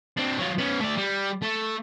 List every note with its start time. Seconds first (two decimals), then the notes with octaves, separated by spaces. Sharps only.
0.17 C4 D4
0.38 F#3 F4
0.58 B3 C#4
0.80 A3 D5
0.97 G3
1.42 A3